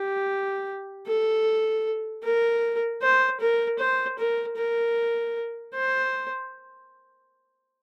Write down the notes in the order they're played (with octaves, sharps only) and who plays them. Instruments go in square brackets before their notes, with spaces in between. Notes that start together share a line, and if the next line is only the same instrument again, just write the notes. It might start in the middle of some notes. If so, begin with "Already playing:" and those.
Already playing: [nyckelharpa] G4
A4
A#4
C5
A#4
C5
A#4
A#4
C5